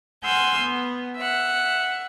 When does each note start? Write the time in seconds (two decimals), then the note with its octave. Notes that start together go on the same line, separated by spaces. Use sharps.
0.24 F#5 G#5 C6 E6 F6 G6
0.60 B3
1.16 E5 F#5